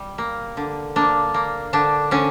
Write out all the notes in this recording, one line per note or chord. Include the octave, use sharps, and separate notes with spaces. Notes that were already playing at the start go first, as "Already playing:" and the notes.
Already playing: G3
A#3
D3
A#3 D4
A#3
D3 D4
D3 C#4